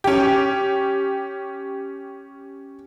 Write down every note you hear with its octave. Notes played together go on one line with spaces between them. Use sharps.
C#4 G4